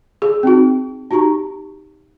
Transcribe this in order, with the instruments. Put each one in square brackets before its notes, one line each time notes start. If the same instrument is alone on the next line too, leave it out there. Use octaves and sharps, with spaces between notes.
[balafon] G#4
C4 D#4 F#4
D#4 F#4 G4 A#5 C#6